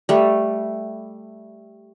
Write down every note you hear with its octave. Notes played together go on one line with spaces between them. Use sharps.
G3 A3